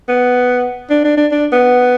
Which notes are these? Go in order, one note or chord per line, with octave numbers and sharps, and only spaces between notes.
B3
D4
D4
D4
D4
B3